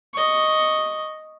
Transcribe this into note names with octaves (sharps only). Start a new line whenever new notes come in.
D#5 C#6